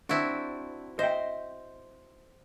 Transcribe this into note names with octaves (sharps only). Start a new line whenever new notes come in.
C4 D4 E4 F#4
C5 D#5 E5 G5